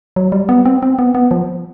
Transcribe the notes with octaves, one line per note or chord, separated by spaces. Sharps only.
F#3
G3
B3
C4
C4
B3
B3
F3